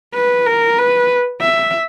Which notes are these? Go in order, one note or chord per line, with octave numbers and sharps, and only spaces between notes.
B4
A#4
B4
E5